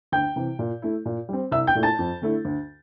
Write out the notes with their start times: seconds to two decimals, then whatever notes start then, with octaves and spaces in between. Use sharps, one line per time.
0.12 D2 G5 G6
0.36 C3 E3
0.59 A#2
0.82 A3 E4
1.06 A#2
1.29 G3 C4
1.52 C2 E5 E6
1.67 G5 G6
1.75 A#2 A3 E4
1.83 A5 A6
1.99 F2
2.22 D3 A3 E4
2.45 D2